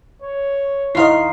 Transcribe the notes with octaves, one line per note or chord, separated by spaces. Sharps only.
C#5
D#2 E4 D#5 F5 A#5 C6 C7